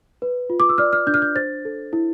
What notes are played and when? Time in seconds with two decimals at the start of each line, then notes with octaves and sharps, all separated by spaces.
0.22 B4
0.50 F4
0.60 D6
0.69 E6
0.78 D5 F6
0.93 F6
1.07 D4 G6
1.14 F6
1.22 G6
1.35 C5 A6
1.65 A4
1.93 E4